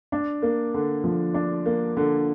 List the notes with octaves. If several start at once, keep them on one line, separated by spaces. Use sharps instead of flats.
D4
A#3
D3
F3
D4
A#3
D3